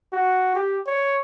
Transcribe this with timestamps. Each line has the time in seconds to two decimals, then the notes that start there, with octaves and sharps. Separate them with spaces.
0.13 F#4
0.55 G4
0.86 C#5